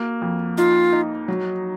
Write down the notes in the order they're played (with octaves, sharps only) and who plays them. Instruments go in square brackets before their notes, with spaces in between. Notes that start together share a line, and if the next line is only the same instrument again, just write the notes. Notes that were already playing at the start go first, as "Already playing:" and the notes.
Already playing: [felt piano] A#3 F#4
F2
[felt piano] D#4 [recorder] F4
[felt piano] D#4
F#3